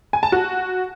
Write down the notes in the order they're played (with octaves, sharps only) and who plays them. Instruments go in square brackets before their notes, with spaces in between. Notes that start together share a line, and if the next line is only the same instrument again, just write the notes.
[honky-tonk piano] G#5
A5
F#4